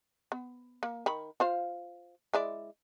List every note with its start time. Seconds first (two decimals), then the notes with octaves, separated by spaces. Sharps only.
0.32 B3
0.83 A#3
1.06 D#3 B5
1.40 F4 C5 F5
2.34 G#3 E4 D5